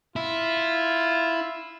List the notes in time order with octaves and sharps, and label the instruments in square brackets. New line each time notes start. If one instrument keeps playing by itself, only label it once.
[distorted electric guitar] E4 [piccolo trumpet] F4